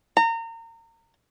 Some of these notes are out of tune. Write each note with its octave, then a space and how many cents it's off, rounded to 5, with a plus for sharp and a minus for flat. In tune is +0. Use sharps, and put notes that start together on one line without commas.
A#5 -30